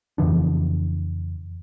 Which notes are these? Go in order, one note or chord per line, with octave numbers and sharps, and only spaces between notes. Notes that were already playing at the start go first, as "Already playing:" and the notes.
F2 C#3 E3 D4